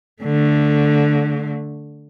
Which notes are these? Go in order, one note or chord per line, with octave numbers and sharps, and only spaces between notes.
D3 A3